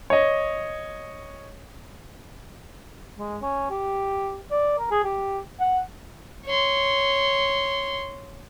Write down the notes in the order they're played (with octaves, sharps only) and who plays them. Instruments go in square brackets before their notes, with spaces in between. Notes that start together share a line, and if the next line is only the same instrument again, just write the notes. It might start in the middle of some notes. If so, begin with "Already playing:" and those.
[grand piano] C#5 D#5
[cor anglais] G#3
C#4
G4
D5
A#4
G#4
G4
F#5
[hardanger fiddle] C#5 C6